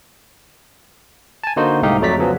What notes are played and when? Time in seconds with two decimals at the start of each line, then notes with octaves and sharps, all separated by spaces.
1.44 G#5 A5
1.56 D3 A#3 D#4 F#4 C5
1.82 C2 G#2 A3 D#4 G4 F5
2.01 F2 F#3 A3 D5 A#5 B6
2.17 C#3 F3 F#3 B3 C#4